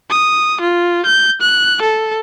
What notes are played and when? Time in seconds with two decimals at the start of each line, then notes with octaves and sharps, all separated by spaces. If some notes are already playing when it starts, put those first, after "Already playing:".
0.10 D#6
0.61 F4
1.06 G6
1.41 F#6
1.82 A4